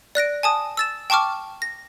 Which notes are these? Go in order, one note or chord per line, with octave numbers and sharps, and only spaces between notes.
D5 F#6 A#6 D7
G#5 A5 D#6
E6 A6 E7
G5 A5 C#6 D6 F6
A#6